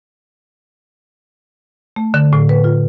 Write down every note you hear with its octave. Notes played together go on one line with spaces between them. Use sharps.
A3
D3
A2
B4
F4